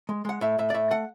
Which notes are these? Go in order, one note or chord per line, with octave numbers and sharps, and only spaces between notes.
G#3
G#3 F#5
A2 E5
A2 E5
D5
A2 E5
A3 F#5